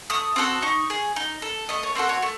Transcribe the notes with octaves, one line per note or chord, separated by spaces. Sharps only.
A3 D#6
C4 F#4 A4
D#4 C#6
G#4
D#4
A4
A3 D#5
C#5
C4 F#4 A4 C5
C#5
A3